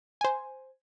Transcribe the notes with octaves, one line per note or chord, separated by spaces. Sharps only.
C5 G#5